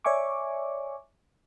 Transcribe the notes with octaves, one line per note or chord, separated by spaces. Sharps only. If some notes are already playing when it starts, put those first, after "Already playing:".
C#5 D5 E5 G#5 C#6 D6